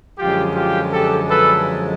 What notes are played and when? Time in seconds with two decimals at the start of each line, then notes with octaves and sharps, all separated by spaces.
0.18 F#2 D3 F3 G#3 F4 G4
0.55 F4 G4
0.93 G4 A4
1.30 A4 B4